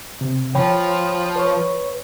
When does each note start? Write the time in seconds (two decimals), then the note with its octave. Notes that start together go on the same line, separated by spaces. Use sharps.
0.21 C3
0.55 F3 C#5 G5 B5
1.36 B4 C#5 C#6